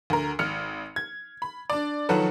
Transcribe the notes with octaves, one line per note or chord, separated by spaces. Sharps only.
D2 A#4
G#1 F6 C#7
G#6
B5
D4 D5
D#3 F3 F#3 F#4 A4 B4